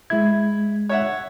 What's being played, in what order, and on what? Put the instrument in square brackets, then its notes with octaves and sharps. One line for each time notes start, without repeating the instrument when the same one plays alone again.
[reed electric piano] G#3 G#6 [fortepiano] E4
[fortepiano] C#5 E5 F#5